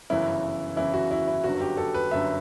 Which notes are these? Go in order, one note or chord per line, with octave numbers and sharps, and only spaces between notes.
G1 F#2 C#3 E3 E4
G1 F#2 C#3 E3 E4
F#4
E4
E4
G1 F#2 D3 F#4
G4
A4
B4
G1 F#2 D3 E5